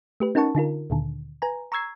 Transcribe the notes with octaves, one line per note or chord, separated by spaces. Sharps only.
A3 G4 B4
C#4 D#4 A#4 F#5 A5 C#6
D3 D#4 F4 A#4
D2 A#2 D3 D#3
B4 G#5 A#5
A#5 C#6 E6 G#6 C7